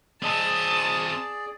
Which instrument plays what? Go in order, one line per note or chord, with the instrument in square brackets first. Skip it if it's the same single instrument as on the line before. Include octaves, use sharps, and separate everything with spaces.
[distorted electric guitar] C4 D#5 [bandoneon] G#4 D5 [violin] A5